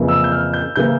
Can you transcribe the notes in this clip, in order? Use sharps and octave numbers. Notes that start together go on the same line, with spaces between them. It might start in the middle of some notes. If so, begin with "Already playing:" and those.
Already playing: F2 C#3 E3 A#3
E6
G6
F6
G6
C#3 E3 A#3 G6